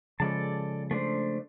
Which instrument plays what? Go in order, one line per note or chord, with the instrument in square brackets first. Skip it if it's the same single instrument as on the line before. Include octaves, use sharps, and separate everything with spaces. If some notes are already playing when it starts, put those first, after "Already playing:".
[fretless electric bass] C#3 F3 G#3 [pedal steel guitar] A4 D5 A5
[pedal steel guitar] A3 D4 C5